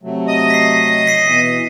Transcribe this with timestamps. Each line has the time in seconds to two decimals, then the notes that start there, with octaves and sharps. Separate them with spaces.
0.03 C3 F#3 A3
0.28 D#5 D#6
0.50 B6 C7
1.07 B6 C7 D#7
1.23 B2 E3